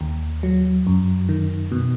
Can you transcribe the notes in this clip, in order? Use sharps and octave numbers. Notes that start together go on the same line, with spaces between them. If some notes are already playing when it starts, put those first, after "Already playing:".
D#2
F#3
F#2
D#3
B2